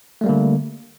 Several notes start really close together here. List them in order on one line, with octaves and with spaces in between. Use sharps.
A3 G3 A#3 D3